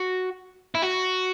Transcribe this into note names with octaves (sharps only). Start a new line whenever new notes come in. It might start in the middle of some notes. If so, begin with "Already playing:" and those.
Already playing: F#4
E4
F#4